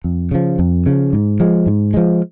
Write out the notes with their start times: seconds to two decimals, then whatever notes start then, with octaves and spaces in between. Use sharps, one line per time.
0.04 F2
0.31 C#3 F3
0.59 F2
0.86 C#3 F3
1.13 G#2
1.40 F3 G#3
1.66 G#2
1.94 F3 G#3